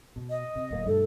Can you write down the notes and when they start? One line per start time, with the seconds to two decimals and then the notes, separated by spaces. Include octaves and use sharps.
0.16 B2
0.29 D#5
0.56 C3
0.71 D1 A#3
0.86 G2 B2 A3 A4